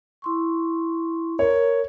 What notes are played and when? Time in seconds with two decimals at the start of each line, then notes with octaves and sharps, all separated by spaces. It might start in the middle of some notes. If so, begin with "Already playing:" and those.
0.22 E4 C6 C#6
1.39 A#4 C#5